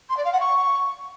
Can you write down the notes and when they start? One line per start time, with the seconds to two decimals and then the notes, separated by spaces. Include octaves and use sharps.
0.09 C6
0.17 D5
0.24 F5
0.32 F#5
0.40 C#6